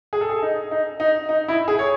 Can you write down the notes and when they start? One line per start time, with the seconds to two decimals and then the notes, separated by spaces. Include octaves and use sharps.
0.13 G#4
0.21 A4
0.30 G#4
0.42 D#4
0.71 D#4
1.00 D#4
1.29 D#4
1.48 E4
1.68 G#4
1.79 C#5